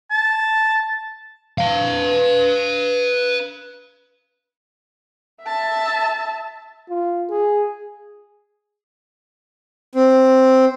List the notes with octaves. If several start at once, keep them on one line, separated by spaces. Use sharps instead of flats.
A5
B4 F5
E5 A5
F4
G#4
C4